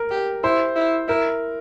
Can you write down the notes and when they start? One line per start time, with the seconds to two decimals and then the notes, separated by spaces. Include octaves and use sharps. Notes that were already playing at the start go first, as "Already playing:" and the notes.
Already playing: A#4
0.11 G4
0.44 E4 C5
0.76 E4
1.08 E4 A#4